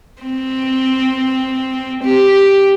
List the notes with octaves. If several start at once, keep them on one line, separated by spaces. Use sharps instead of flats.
C4
G4